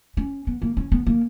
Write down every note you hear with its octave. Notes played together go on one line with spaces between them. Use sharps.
C#4
B3
A#3
C#4
B3
A#3